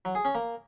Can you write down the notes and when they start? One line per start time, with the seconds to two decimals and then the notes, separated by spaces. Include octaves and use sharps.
0.05 F#3
0.15 G#4
0.25 C#4
0.35 A#3